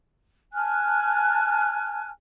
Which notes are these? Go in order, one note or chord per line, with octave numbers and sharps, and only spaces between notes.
G#5 A5 F6 F#6